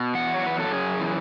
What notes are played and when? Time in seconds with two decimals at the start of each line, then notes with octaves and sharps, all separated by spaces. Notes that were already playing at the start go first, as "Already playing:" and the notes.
Already playing: B2
0.14 E2 F#5
0.34 C#5
0.43 F#3 B4
0.60 A4
0.72 F#2 G#4
1.00 E3